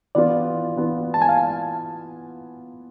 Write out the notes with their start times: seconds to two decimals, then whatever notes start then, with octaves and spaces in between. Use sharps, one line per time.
0.15 E3 B3 F4 D5
0.76 E3 B3 F4
1.14 A5
1.22 G#5
1.29 F5